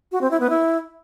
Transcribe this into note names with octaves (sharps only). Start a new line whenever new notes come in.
F#4
C4
E4
B3
E4